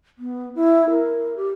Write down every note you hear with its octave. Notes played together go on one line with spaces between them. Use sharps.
B3
E4
A#4
G4